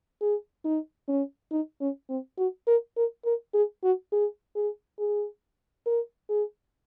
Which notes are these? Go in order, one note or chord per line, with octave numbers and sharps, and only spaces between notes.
G#4
D#4
C#4
D#4
C#4
C4
F#4
A#4
A#4
A#4
G#4
F#4
G#4
G#4
G#4
A#4
G#4